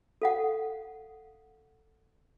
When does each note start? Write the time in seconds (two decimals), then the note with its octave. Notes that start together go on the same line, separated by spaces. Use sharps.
0.22 A4 F5 F#5